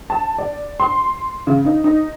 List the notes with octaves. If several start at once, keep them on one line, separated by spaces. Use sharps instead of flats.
A5
D5
C6
C#3
D#4
D#4